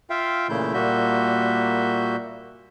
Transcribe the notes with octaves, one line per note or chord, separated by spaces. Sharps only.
F4 E5 F5 G5
A#2 C#3 E3 A3 E4 G6
A#2 G3 A#3 F#4 E5 G6